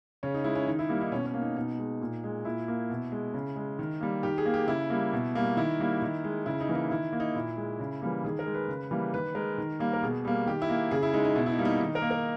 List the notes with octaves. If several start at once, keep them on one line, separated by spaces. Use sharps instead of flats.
C#3 C#4
D#4
G#3 E4
C#4
D#3 D#4
E4
G3 A#3
D#4
B2 C#4
C#4
A#3
D#4
B2 D#4
G#3
A#2
G#3
A#2 E4
A#3
B2
G#3
C#3
G#3
D#3
G3 A#3
D#3 G4
G#4
A#3
G4
C#3 E4
G3 A#3
B2
G3 A#3
D#3 E4
G3 A#3
D#3
G#3
C#3 E4
D#4
E3 A#3
D#4
D#3 E4
A#3
D#4
A#2 E4
G#3
C#3
E3 G3 A#3
D#3 G#4
A#4
G#3
B4
C#3
E3 G3 A#3
D#3 B4
G#3 A#4
D#3
G3 A#3
A#4
B2 G#4
G3 A#3
D#3 G4
E4
A#3
C#3 G#4
E4
G#3 D#4
D#4
B2 E4
E4
D#4
G3 A#3
D#4
D#3 D#4
A#4
A#3
A#4